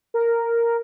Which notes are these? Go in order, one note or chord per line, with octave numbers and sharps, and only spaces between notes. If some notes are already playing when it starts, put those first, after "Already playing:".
A#4